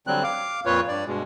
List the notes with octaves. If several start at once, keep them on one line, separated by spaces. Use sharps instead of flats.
D3 F#3 G3 C4 F#6
F5 D6
F2 A#2 F4 B4 C#5
G2 D5
G2 B2 G#3